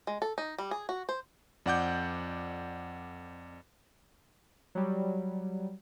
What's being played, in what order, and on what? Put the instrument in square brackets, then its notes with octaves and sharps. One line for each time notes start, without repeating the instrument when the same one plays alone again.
[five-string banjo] G#3
A4
D#4
G3
G#4
F#4
C5
[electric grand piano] F2 D5 F#5 D6 G6
[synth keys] F#3 G3